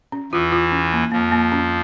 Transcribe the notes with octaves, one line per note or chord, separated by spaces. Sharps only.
C#4
E2 E3 F4
F4
C#4
A#3
F2 F3 A#3
A#3
C#4